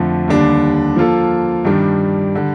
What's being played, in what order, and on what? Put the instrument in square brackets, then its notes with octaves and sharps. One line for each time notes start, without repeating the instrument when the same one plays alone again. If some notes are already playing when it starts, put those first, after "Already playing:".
Already playing: [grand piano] F2 D3 F3 A3
D#2 D3 G3 D4
F3 A#3 F4 A4
G2 D#3 G3 D4
D3 G3